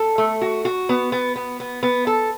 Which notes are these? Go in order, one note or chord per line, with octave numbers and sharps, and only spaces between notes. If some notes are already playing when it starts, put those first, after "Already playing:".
Already playing: A4
A3
F#4
F#4
B3
B3
B3
B3
B3
A4